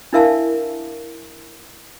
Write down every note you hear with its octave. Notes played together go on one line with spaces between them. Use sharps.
D4 E4 A#4 E5 F5 A5